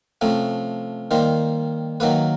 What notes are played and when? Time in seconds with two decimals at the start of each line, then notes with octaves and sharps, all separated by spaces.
0.21 C3 F3 A3 C#4
1.11 D#3 G3 A#3 C5
2.00 D#3 F#3 A#3 B4